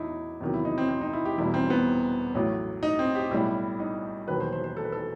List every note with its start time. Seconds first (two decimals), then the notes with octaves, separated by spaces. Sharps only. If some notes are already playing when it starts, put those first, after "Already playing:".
Already playing: E2 F#3 D#4 E4
0.40 E2 C3 D#3 F#3
0.54 E4
0.65 D#4
0.78 C4
0.89 C4
1.01 D#4
1.13 E4
1.25 G4
1.38 E1 E2 B2 G3 E4
1.54 C4
1.70 B3
2.35 A1 A2 F#3
2.83 D#4
2.99 C4
3.15 G4
3.31 B1 A2 G3 E4
3.80 D#4
4.28 E1 D#2 D#3 F#3 B4
4.40 C5
4.53 C5
4.64 C5
4.77 A4
4.84 B4
4.92 A4